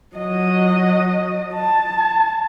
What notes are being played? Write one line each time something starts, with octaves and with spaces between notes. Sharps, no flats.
F#3 D#5
A5